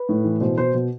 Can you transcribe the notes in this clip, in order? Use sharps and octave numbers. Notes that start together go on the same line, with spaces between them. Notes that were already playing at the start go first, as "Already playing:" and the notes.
Already playing: B4
A2
E3
B2 C5
B2 C5
B2